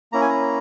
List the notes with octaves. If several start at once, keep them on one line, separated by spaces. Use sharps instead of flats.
A#3 C#4 E4 A#5
G#5
A#5